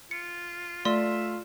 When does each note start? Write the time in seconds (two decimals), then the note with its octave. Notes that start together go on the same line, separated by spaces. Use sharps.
0.11 F4 C#7
0.85 A3 F4 D5 E5 C6